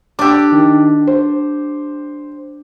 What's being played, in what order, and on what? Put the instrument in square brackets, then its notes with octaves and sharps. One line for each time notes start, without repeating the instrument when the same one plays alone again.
[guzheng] D4 G4 [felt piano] D6 E6
[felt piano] D#3
C5